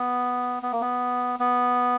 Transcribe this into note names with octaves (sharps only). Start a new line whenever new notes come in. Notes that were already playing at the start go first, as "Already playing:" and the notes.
Already playing: B3
B3
A#3
B3
B3